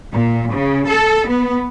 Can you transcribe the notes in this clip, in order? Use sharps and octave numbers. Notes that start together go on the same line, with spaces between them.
A#2
C#3
A4
B3